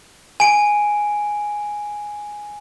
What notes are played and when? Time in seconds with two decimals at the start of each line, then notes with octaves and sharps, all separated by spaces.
0.40 G#5 D7